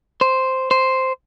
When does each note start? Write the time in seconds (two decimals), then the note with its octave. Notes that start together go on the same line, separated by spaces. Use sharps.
0.21 C5
0.71 C5